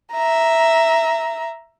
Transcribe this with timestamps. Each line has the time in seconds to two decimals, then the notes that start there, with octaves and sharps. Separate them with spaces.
0.12 E5 A#5